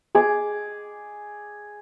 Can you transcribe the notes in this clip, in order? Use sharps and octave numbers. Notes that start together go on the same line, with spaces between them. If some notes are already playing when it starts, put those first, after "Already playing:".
G#4 D6